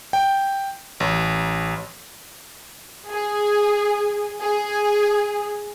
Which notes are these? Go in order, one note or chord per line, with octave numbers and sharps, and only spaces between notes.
G5
A1
G#4
G#4